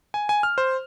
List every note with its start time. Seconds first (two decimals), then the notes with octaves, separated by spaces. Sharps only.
0.14 G#5
0.29 G#5
0.43 F6
0.58 C5